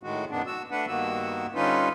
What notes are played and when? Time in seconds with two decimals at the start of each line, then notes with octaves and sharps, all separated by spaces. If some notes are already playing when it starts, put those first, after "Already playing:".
0.03 A2 D#3 G#3 F#4
0.31 F#2 B2 D#3 B3 D4
0.47 F#4 E6
0.71 A3 D4 B4 F#5
0.88 G2 D#3 A#3 B3 F#4 E6
1.55 D3 G3 C#4 D#4 F4 B4